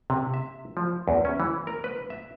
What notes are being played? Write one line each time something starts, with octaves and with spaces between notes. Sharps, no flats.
C3
E5
F3
E2
C#4
E3
A#4
B4
E5